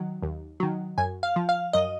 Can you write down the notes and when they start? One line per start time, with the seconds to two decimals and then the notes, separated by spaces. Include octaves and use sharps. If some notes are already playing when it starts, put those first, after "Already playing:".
Already playing: D#3 F#3
0.23 D#2
0.60 D#3 F#3
0.98 F#2 G#5
1.23 F5
1.36 F3
1.49 F5
1.73 F#2 D#5